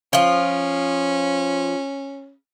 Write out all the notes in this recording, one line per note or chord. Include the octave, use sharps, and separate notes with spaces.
F3 C#4 F4